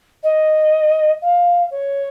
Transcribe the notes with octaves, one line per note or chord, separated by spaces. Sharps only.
D#5
F5
C#5